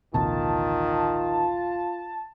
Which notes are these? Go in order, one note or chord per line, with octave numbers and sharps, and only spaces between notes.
A1 D2 B2 D#3 F4 A5